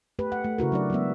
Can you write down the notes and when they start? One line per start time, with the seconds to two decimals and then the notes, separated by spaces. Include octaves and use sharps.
0.19 A3 G4 B4
0.32 F#5
0.44 A3
0.58 C#3 E4 F#4 A#4
0.72 F#3 D4 D5
0.90 F#3 G#3 B3 E5